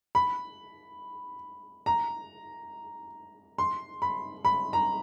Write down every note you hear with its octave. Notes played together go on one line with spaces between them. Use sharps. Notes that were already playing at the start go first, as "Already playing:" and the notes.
B5
A#5
C6
B5
B5
A#5